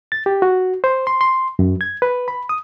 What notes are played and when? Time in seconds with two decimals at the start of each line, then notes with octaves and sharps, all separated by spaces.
0.12 A6
0.26 G4
0.42 F#4
0.84 C5
1.07 C6
1.21 C6
1.59 F#2
1.81 G#6
2.02 B4
2.28 B5
2.49 D#6